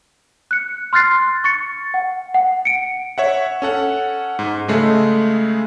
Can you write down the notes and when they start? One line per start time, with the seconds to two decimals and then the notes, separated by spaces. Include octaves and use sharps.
0.51 F#6 C#7
0.93 C6 F6 F#6 A6 C7
1.44 C#6 A6 C#7
1.94 F#5
2.34 F#5
2.65 C#7 D7
3.18 C#5 E5 F#5
3.62 C#4 A4 F#5
4.39 G#2
4.68 C#3 G#3 A3